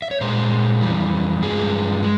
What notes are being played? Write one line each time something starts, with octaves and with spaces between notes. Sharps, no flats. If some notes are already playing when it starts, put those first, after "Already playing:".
E5
C#5
A#2 G#3 C5
F2 E3 G3
G2 F3 G#3 G#4
G#3